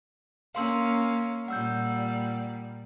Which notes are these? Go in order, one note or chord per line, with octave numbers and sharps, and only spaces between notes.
A#3 C#4 F5 C6 E6
A#2 G3 F#5 E6 G6